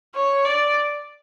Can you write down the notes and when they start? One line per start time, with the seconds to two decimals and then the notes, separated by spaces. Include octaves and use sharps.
0.15 C#5
0.45 D5